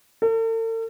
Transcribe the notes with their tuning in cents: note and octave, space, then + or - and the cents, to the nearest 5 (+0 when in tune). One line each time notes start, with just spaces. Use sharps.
A4 +45